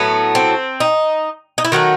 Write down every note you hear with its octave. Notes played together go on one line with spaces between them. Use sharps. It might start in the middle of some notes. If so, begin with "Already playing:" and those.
Already playing: A2 F#3 A3 B3
C4
D#4
D#4
E4
D#3 F#3 A3 F#4